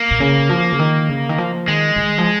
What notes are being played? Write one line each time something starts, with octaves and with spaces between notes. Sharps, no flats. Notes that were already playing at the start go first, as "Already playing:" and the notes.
Already playing: A#3
A#2
C#3
F3
C#3
D#3
C#3
D#3
F3
D#3 G#3
D#3
F3